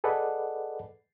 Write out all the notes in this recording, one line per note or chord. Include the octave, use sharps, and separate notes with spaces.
G#4 A4 B4 D5 D#5 F#5